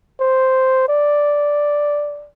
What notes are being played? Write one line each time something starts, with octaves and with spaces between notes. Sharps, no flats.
C5
D5